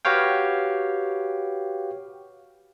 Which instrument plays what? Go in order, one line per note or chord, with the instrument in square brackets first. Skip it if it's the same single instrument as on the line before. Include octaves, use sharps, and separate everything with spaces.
[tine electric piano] F#4 G4 B4 C#5 F5 G5